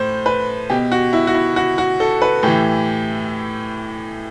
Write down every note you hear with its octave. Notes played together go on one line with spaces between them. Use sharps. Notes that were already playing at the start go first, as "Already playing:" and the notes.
Already playing: A2 C5
B4
B2 G4
F#4
E4
F#4
E4
F#4
F#4
A4
B4
A2 E3 G4